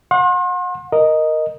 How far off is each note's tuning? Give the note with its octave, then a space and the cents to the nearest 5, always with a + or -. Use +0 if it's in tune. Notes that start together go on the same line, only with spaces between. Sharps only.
F#5 -35 C6 +40
A#4 +0 D#5 +0